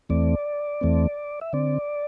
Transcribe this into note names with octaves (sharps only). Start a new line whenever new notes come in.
E2 E3 A3 C4 D5
E2 E3 A3 C4
E5
D3 C4 D5